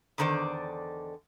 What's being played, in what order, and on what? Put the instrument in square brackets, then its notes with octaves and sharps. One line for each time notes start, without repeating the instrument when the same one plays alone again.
[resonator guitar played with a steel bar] E2 D3 D#3 C5 D5